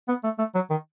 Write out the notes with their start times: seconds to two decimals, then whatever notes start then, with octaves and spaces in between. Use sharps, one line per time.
0.08 B3
0.24 A3
0.38 A3
0.55 F#3
0.70 D#3